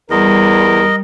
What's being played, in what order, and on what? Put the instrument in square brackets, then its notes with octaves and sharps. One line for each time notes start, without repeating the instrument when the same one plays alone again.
[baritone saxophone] E2 [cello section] G3 [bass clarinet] A#4 [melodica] D#5